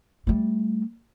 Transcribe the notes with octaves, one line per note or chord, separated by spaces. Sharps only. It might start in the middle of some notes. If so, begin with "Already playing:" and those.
G3 A3